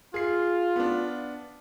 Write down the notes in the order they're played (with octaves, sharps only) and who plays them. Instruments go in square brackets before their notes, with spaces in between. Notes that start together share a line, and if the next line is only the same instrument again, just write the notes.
[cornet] F4 [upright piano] G#4 C7
[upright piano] B3 D4